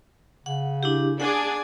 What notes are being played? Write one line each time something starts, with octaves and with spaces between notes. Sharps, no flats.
C#3 F#5
D4 E4 G4
D4 G#4 D5 F#5 G#5